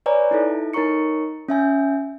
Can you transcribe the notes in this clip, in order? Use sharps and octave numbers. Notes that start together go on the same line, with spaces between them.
B4 C#5 D5 G#5 A#5
D#4 E4 A4
D#4 A#4 C#5 A#5 C#6 C#7
C#4 E5 G#5 G6